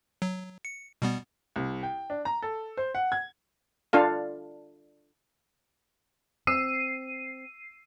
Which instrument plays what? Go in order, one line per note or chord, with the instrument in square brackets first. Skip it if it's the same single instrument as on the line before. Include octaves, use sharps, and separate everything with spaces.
[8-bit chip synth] F#3
C#7
B2 G3 B3
[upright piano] C2
G5
D4
A#5
A4
C5
F#5
G#6
[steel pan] D4 F4 A4 F5
[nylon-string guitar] C4 [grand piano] E6 [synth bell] C7 D#7